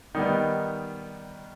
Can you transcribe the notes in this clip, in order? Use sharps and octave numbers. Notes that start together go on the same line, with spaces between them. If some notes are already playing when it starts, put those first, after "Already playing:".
D#3 G3 B3 D#4